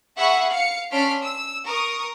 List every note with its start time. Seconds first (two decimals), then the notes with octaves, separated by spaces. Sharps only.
0.16 G#4 E5 F#5 B5 C#6
0.48 F5 C#7
0.91 C#4 D4 C6 F6 B6 D7
1.21 E6
1.64 A#4 C#6 D#6